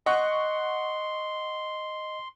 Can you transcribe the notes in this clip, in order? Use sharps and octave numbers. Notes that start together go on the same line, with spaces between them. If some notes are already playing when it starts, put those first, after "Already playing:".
D#5 F#5 C6 C#6 F#6